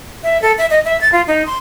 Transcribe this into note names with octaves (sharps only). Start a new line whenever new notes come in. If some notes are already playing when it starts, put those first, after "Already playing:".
E5
A4
E5
D#5
E5
A6
F4
D#4
C6